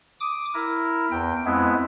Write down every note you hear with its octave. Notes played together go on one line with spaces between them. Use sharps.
D6 D#6
E4 A#4
E2 G5
F2 G#3 B3 E4